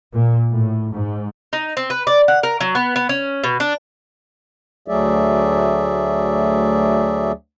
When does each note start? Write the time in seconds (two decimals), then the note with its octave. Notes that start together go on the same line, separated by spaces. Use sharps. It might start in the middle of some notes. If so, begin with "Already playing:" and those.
0.14 A#2
0.51 A2
0.91 G#2
1.53 D#4
1.77 C4
1.90 B4
2.07 D5
2.28 F#5
2.43 A#4
2.60 F#3
2.75 B3
2.96 B3
3.09 C#4
3.44 B2
3.60 D4
4.88 D2 F#3 A3 G#4 D5 E5